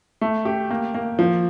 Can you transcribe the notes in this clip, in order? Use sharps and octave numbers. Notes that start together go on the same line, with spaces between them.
A3
G4
A#3
A#3
F3